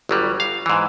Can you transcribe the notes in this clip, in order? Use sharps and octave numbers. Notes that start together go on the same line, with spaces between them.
G1 F#3 G3
F5
G#2 E3